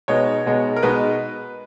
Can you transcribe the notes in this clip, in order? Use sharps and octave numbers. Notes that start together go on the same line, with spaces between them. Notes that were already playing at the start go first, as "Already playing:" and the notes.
B2 G#3 B3 D#4 C#5
B2 G#3 B3 D#4
A#4
B2 G#3 B3 D#4 B4